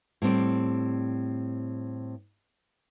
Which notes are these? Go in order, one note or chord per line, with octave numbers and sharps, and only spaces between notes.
A2 G3 C4 D5